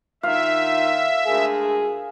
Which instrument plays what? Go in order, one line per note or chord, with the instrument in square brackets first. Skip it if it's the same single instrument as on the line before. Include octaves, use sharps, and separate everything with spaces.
[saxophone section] D#3 A#3 F4 [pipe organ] E5 [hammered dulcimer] F5
[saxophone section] D2 G#3 A#4 [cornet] G#4